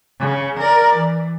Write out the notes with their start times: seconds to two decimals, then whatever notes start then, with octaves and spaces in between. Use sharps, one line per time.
0.20 C#3
0.59 A#4 D5
0.97 E3